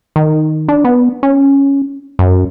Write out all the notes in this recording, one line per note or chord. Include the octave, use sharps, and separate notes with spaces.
D#3
D4
B3
C#4
F#2